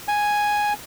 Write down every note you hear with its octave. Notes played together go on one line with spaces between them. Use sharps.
G#5